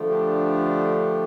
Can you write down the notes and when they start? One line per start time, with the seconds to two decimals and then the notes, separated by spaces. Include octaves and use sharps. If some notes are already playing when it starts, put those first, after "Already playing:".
Already playing: D3 F3 A3
0.08 D4 G4